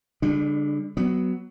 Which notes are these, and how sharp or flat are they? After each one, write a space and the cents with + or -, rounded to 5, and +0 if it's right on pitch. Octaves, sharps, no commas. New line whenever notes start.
D3 -35 G3 +40 D4 +20
F#3 +15 B3 +5